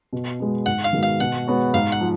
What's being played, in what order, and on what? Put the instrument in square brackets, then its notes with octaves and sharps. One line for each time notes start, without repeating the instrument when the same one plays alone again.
[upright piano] B2
G#3 B3
[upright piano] G#2 [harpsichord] F#5
[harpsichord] F5
[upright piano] D#3 G#3 B3 F#4
[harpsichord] F5
[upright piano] B2 [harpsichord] F#5
[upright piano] G#3 B3 F#4 C#5
[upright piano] G#2 [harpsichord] F5
[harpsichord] F#5
[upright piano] F3